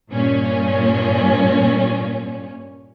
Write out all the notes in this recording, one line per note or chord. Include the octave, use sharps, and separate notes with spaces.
G2 A#2 C#4